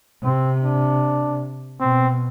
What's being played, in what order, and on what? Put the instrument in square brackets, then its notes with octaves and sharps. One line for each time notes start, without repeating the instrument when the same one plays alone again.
[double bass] C3 [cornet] C4
[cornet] D4
[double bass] B2 [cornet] C4